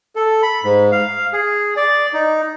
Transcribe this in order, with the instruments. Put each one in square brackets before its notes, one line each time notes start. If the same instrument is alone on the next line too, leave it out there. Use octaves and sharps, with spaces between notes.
[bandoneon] A4
B5
G#2
F5
G#4
D5
D#4